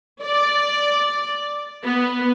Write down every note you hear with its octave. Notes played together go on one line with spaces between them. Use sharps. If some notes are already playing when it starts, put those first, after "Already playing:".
D5
B3